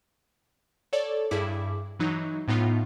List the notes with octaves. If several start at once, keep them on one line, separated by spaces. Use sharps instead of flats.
A4 C#5 D5
G2 E4 G#4 D6
E3 F#3 D#4
A2 B3 D#4 F4